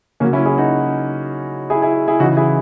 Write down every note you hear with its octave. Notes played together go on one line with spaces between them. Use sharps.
C#3 F#3 A#3 C#4
C#4 E4
E4 G#4
D#4 F#4
E4 G#4
E4 G#4
E4 G#4
C#3 E3 D#4 F#4
E4 G#4